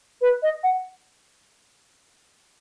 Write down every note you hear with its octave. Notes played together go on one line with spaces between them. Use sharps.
B4
D#5
F#5